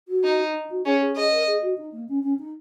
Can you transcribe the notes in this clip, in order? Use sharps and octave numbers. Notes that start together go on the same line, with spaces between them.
F#4
D#4
D#4
F#4
C#4 G#4
G#4
G#4 D#5
A#4
G#4
F#4
D#4
A#3
C#4
C#4
D#4